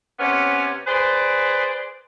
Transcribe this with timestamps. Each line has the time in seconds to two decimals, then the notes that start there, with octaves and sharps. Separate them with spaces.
0.19 C3 B3 C#4
0.87 G#4 B4 C5 D5